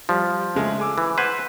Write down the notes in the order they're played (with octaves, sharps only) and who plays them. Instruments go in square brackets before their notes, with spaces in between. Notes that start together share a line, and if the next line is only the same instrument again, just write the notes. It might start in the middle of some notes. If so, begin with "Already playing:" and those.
[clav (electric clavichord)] F3 [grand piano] G3
[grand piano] C#3 G#3 A3
G#5 D6 E6
[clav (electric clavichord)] E3
[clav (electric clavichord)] B4 C5 [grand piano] F#5 G#6